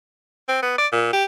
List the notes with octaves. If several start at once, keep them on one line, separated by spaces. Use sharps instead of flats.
C4
B3
D5
A#2
G4